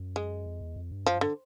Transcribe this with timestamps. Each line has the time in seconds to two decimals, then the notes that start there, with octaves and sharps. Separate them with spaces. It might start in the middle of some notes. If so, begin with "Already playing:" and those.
Already playing: F#2
0.16 G#3
0.46 F2
0.61 E2
0.76 F2
0.91 G2
1.06 F#2 F3
1.16 G2
1.21 D3